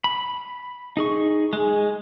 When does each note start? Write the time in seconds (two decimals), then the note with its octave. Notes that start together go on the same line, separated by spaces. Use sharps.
0.04 B5
0.97 D#4 G#4 C#6
1.53 G#3 G#4